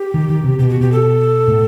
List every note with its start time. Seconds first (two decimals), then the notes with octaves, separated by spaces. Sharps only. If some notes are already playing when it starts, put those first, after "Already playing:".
Already playing: G4
0.14 D#3
0.30 D#3
0.44 C3
0.59 B2 G4
0.69 F#4
0.81 B2 G4
0.92 A4
1.48 A2